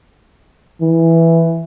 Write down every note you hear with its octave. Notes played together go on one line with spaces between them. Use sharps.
E3